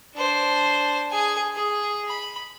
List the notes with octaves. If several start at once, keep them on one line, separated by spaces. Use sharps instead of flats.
D4 C5
G#4 G#5
G#4
B5